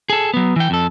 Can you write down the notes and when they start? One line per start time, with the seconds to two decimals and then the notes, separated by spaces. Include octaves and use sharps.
0.10 G#4 A4
0.34 F#3 B3
0.56 E3 G5
0.70 F2 A4